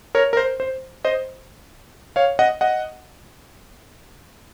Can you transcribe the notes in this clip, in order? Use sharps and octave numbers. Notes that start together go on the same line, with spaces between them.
A#4 C#5
A#4
C5
C5
C5 D#5
C#5 F5
D#5 F#5
D#5 F#5